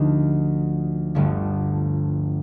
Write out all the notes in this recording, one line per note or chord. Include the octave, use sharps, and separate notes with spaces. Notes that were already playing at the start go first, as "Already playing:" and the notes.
Already playing: D2 D3 F3 A3 D#4
G1 G2 D3 F3 A3